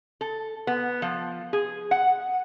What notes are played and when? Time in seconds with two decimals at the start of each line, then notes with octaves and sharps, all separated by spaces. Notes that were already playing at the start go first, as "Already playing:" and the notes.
0.21 A4
0.67 B3
1.02 F3
1.53 G#4
1.91 F#5